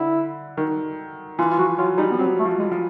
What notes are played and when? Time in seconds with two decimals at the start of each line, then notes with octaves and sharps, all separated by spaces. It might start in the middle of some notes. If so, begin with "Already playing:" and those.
Already playing: D3 E4
0.57 D#3
1.39 E3 F4
1.51 F4
1.58 F3 F#4
1.78 F#3 F4
1.98 G3 D#4
2.11 B3
2.18 F#3 C4
2.39 A3
2.45 F3
2.59 G#3
2.72 F3